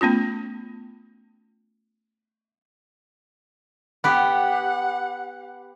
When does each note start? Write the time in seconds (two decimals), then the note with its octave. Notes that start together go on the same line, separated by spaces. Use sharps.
0.01 A3 B3 C#4 F4
4.04 B3 G4 F#5